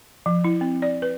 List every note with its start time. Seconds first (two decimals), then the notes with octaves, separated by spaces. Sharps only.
0.26 F3
0.44 E4
0.61 C4
0.82 D5
1.02 B4